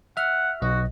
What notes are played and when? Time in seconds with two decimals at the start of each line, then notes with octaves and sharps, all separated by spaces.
0.17 E5 F#5 F6
0.62 B1 F#4 D#5